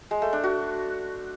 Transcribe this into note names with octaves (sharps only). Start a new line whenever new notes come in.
G#3
A3
D4
F#4